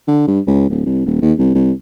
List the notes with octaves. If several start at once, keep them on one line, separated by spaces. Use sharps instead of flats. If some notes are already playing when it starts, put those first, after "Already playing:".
D3
G2
C#2
D1
C2
D#1
D#2
C2
C2